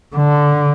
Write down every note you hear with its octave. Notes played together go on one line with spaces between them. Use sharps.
D3